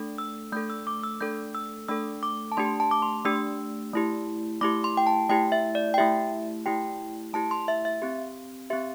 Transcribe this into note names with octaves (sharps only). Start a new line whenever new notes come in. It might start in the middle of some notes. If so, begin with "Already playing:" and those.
Already playing: A3 D4 A4
E6
A3 D4 A4 G6
E6
D6
E6
A3 D4 A4 G6
E6
A3 D4 A4 E6
D6
A5
A3 D4 G4 C6
A5
D6
C6
A3 D4 G4 E6
A3 E4 G4
A3 E4 G4 D6
C6
G5
A5
A3 E4 G4 G5
E5
D5
G5
A3 E4 G4 E5
A3 E4 G4 G5
A3 E4 G4 A5
C6
E5
E5
C4 G4
C4 G4 E5